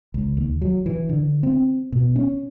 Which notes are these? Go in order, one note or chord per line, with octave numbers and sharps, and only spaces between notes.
C#2
D#2
F#3
E3
D3
C4
B2
C#4